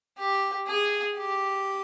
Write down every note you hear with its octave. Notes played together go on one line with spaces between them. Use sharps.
G4
G#4
G4